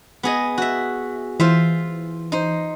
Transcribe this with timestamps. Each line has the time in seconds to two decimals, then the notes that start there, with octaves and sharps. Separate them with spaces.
0.23 B3 G#4 D#5
0.58 F#4 E5
1.40 E3 F4 C5 E5
2.32 D#4 C5